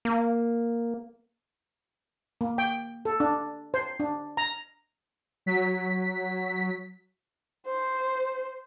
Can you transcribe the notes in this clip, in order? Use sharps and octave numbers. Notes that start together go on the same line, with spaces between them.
A#3
A#3
G5
A4
D4
C5
D4
A#5
F#3 B6
C5